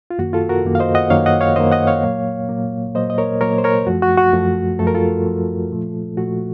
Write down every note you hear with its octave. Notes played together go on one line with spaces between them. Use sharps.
F4
F#2 D#3 A#3 F#4
F4 A4
F#4 A#4
F#2 D#3 A#3
F5
C5 D#5
D#5 F#5
F#2 D#3 A#3 C#5 F5
D#5 F#5
C#5 F5
F#2 D#3 A#3 C5 D#5
D#5 F#5
C#5 F5
A#2 F#3 A#3
A#2 F#3 A#3
A#2 F#3 A#3 C5 D#5
D#5
A#4 C#5
A#2 F#3 A#3 A#4 C#5
C5
A#4 C#5
F#2 F3 A3 F#4
F#4
F#4
F#2 F3 A3
F#2 F3 A3 A4
A#4
F4 A4
F#2 F3 A3
A#2 F3 A3
A#2 F3 A3 F#4